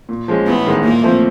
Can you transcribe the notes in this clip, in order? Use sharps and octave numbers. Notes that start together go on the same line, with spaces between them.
A#2
F3 G#3 C#4
A1 B3
G#2 D#3 G#3
A#2 A#3
F3 A3 C4